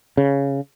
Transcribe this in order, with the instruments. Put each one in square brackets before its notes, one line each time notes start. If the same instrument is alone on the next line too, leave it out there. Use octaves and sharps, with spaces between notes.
[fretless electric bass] C#3